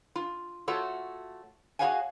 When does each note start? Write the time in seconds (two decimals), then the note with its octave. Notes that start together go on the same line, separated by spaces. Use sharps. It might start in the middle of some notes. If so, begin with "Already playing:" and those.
0.16 F4
0.68 A3 F4 F#4 A4 C#5
1.79 F#4 G#4 C#5 F5 F#5 G#5